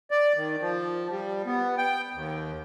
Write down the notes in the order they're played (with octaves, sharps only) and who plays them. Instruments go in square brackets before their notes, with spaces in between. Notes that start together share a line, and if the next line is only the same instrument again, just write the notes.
[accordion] D5
D#3
F3
G3
B3
G5
D#2